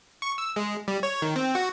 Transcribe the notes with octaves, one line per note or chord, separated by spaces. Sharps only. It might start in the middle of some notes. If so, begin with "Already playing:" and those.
C#6
E6
G#3
G3
C#5
D#3
C4
F#4